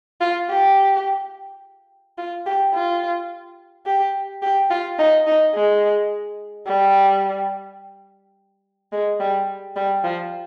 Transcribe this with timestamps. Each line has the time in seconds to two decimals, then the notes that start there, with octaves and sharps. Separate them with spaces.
0.21 F4
0.50 G4
2.18 F4
2.46 G4
2.73 F4
3.87 G4
4.42 G4
4.70 F4
4.99 D#4
5.27 D#4
5.55 G#3
6.67 G3
8.93 G#3
9.20 G3
9.76 G3
10.04 F3